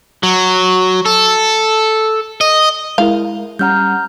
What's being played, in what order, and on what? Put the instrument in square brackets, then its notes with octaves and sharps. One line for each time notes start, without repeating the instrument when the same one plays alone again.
[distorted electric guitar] F#3
A4
D#5
[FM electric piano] G#3 E4 A#4 [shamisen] F5
[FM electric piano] G3 C#4 F#5 [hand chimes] A#5 F6 G6